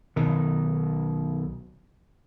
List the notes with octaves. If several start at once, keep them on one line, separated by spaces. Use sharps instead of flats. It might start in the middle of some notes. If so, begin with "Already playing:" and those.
B1 D#3